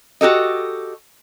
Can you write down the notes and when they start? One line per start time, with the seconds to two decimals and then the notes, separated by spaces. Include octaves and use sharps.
0.21 F#4 G4 A4 D#5